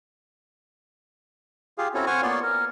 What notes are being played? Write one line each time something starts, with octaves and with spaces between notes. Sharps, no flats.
F4 G4 G#4 F5
C4 C#4 E4 F#4 A4 C#5
C5 F#5 G#5 C#6 F6
A#3 B3 F4 C#5 D5 C6
A#4